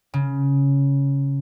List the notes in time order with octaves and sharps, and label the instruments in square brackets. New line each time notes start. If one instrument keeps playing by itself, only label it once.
[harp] C#3